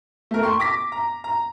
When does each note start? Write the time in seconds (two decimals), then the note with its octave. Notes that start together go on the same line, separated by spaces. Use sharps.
0.31 A3 A#4
0.43 G5 C6 C#6
0.60 D6 A#6 B6
0.92 A#5
1.24 A#5